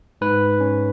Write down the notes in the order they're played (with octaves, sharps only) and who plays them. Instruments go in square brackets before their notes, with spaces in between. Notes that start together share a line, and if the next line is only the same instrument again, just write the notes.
[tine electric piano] G#2 B4
C#4